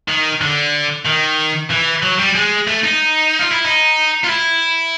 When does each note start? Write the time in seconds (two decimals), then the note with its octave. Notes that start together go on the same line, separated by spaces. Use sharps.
0.08 D#3
0.41 D3
1.06 D#3
1.70 E3
2.03 F#3
2.19 G3
2.35 G#3
2.67 A3
2.84 D#4
3.39 F4
3.52 E4
3.65 D#4
4.24 F4
4.29 E4